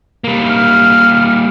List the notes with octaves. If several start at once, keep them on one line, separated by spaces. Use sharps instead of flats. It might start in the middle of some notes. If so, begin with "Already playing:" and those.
G3 A#3
F6